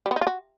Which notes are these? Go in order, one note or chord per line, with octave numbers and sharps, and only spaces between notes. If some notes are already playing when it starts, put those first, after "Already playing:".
G3
B3
D#4
F4
F#4